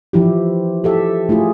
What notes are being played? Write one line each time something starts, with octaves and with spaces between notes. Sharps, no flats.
E3 F3 E4 G4
G4 A4 E5
A3 E4 F4 G#4